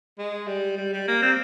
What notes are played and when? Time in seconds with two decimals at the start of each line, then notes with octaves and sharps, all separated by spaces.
0.19 G#3
0.47 G3
0.78 G3
0.93 G3
1.08 A#3
1.22 C4